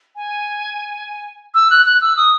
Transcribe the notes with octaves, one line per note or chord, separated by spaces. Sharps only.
G#5
E6
F#6
F#6
E6
D#6